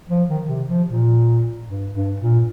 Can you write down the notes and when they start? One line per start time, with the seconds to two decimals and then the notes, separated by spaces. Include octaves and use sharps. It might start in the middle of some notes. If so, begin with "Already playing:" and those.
0.09 F3
0.28 D#3
0.48 C3
0.68 F3
0.89 A#2
1.67 G2
1.93 G2
2.20 A#2